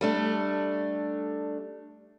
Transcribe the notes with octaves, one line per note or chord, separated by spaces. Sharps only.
G3 A3 D4